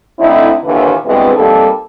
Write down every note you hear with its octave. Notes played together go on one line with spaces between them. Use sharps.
D3 A3 C4 D#4 E4
D#2 A#2 D3 E3
G2 B2 E3 G#3 B3 C4
G3 A#3 C4 D#4 G4 A4